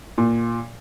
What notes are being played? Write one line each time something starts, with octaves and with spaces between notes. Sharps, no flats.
A#2